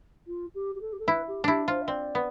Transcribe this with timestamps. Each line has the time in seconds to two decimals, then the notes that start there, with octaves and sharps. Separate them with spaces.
0.27 F4
0.55 G4
0.75 G4
0.81 A4
0.93 G4
0.99 A4
1.08 E4 B4
1.28 G4
1.44 D4 E4 G4
1.68 F4 C5
1.82 E5
1.88 C4 D5
2.15 B3